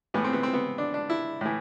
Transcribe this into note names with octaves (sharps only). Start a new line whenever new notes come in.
A2 E3 B3
C4
B3
C4
B3
D4
D4
E4
A2 E3